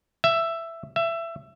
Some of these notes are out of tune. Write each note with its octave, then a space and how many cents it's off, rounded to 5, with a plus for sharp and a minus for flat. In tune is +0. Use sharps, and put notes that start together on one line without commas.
E5 +10
E5 +20